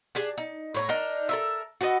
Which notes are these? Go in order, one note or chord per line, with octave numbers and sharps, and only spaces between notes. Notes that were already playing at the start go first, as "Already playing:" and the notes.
D4 G4 G#4
D#4
A2 C#5 A#5
D4 D#4 A#4
A4 A#4 E5
F#4 A4 B4 D#5